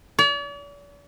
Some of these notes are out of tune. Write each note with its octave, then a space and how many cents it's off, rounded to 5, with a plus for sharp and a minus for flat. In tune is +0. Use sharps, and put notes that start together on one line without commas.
D5 -45